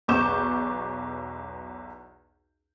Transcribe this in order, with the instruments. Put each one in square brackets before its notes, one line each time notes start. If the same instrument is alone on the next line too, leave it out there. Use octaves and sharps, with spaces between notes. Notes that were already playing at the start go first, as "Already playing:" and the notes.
[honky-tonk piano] B1 E2 C#6 D6 G6 E7